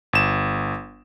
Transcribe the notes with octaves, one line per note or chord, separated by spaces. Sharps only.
G1 E7